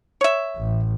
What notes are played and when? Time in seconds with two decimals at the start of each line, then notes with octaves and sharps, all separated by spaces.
0.21 C#5 E5
0.56 A1